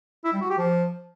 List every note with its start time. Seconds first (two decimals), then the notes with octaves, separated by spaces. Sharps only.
0.25 E4
0.33 G3
0.42 F#4
0.50 G4
0.58 F3